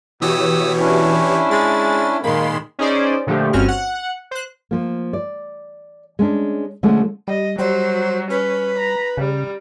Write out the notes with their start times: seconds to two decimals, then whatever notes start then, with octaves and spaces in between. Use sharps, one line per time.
0.22 B2 E3 G4 C#5 D#6 E6
0.81 C#4 D4 E4
1.51 G#3 A6
2.24 A#2 D#3 G#3 A#3 B5 C6
2.79 C#4 D#4 G#4 C5 D5
3.27 A#2 D3 F3 A3 G4
3.53 G1 G2 C4 C#4 F#4 F6
3.68 F#5
4.31 C5 F#6
4.71 F3 A#3
5.13 D5
6.19 G#3 C#4 D4
6.83 D3 F3 G#3 A3 C#4 D4
7.28 G3 D#5
7.59 F#3 G3 C5
8.30 C#4 B4
8.77 A#5
9.17 C#3 G3